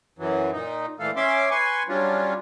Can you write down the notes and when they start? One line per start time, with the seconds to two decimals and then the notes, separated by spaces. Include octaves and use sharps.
0.19 F#2 E3 F#3
0.53 A#2 D#4
0.99 A#2 E3 A3 A4 F5
1.16 C#4 E5 C6 D6
1.51 B4 G#5 C6 C#6
1.89 F#3 G3 C#4 D4 F4